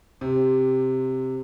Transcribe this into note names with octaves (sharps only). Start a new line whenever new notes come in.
C3